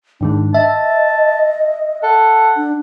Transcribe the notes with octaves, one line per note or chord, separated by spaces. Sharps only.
G#2 D#3 G#3 D4
D#5 E5 A5
A4 F#5
D4